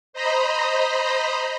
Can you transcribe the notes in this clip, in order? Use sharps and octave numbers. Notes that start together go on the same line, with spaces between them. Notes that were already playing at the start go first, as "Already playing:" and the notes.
C5 D#5 A#5 B5